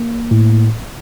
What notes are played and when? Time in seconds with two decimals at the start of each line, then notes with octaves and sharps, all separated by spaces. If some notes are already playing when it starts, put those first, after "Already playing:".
Already playing: A#3
0.31 A2